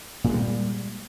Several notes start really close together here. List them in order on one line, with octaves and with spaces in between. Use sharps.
A#2 G#3 G3